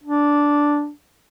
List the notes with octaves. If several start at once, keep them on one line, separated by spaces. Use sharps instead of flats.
D4